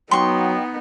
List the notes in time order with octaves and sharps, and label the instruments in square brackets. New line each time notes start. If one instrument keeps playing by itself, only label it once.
[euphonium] F#3 [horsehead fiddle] B3 D#4 [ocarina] G5 [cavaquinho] C6 C#6